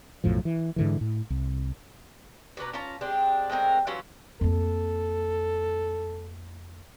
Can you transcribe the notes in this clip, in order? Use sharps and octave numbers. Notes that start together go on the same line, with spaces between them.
B1 F#2 A2 F3
E3
G#2 D3 E3
A2
C2
B2 D4 B4 A#5
C#4 F4 A5 A#5
G#3 C4 D4 G4
G#3 A3 C4 A#4
E3 F#3 C#4 F4
F2 A#3 A4